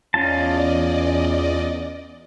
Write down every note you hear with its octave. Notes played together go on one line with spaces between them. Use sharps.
E2 C#4 F4 D5 D#5 A5